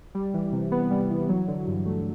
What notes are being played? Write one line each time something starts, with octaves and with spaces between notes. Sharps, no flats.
G3
E3
C3
B3
G3
E3
F#3
D3
G2
A3